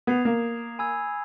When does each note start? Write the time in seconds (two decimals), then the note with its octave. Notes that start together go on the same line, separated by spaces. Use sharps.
0.07 B3 D#6 G#6 C7 F7
0.25 A#3
0.79 G#5 B5 E6 G#6